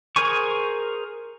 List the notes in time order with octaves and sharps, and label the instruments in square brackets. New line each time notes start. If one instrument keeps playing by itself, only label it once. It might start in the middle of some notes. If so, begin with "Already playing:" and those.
[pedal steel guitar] G#4 A#4 C5 G#5 C#6